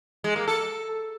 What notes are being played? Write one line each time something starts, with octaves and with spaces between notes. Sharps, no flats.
G#3
A#3
A4